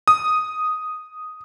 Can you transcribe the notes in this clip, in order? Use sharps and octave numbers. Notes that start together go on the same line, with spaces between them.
D#6